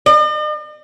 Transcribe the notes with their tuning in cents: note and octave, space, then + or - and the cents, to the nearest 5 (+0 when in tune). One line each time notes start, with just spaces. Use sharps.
D#5 -45